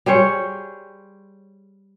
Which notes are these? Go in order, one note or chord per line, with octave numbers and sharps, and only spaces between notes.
G3 G#4 C5 C#5